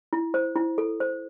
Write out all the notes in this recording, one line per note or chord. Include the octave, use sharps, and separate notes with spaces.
E4
C5
E4
A4
C5